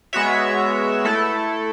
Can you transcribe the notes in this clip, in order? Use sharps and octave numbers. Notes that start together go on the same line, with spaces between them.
G#3 B3 F#4 C#5 E5
A3 E4 A4